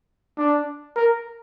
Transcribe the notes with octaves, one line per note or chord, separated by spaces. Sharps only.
D4
A#4